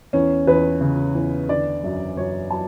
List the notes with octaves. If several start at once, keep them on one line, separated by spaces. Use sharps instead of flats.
E2 C#4
E2 B4
C#3
E2
D3 D5
F#2
F#2 C#5
F#3 A5